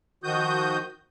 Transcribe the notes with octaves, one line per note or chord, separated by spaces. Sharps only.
D#3 F3 F#4 D#6 G6